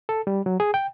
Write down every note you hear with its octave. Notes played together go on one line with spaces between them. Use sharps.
A4
G3
F#3
G#4
G5